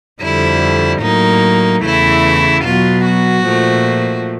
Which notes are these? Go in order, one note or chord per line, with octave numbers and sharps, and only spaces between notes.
F2 D3 G3 E4
A2 F#3 A#3 D#4
E2 C#3 E3 A3 E4
B2 F#3 B3 F4
F#4
A#2 F3 A3